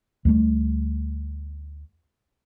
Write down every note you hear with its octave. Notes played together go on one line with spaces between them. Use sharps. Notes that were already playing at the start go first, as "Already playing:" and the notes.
D2 G3 A3